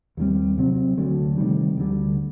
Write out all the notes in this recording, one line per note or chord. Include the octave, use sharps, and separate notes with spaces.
D#2 D3 G3 C4
C3 F#3 C4
D2 D3 F#3 A3
C3 D#3 G3
D2 D3 G3